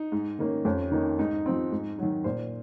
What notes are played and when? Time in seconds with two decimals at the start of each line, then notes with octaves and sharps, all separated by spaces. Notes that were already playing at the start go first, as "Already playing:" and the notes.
Already playing: D#4
0.12 G#2
0.39 D#3 A#3 C#4
0.65 F2 C#4
0.92 D#3 A#3 C#4 D#4
1.19 G#2 D#4
1.46 F3 C4
1.71 G#2
1.98 D#3 F#3
2.24 A#2 C5